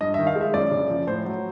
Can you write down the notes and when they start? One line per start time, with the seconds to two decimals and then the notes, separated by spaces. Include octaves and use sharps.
0.01 G2 D#5
0.14 D#3 E5
0.27 F5
0.36 G#3
0.41 E5
0.54 F#2 D5
0.71 C#3
0.90 F3
1.07 A2 C5
1.26 F#3